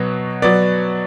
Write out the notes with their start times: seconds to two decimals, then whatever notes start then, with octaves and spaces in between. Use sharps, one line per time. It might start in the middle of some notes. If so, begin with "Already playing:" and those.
Already playing: B2 F#3 B3
0.42 F#3 B3 D5